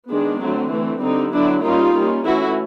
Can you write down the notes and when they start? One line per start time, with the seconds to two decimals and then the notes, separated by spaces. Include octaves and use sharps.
0.11 D#3 G#3 B3 D4
0.41 D3 F#3 A3 C4
0.72 E3 A3 C4
1.02 D3 G3 C4 D#4
1.32 D3 F#3 B3 D4 E4
1.63 G3 A#3 C#4 D#4 F4
1.93 G3 A#3 C#4
2.24 E3 A3 C#4 E4 F#4